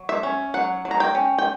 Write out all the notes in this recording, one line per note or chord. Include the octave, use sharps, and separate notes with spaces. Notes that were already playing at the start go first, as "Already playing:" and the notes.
Already playing: F#3
E5
C#4
F#3 F#5
F#3
A#5
G5
C#4
G5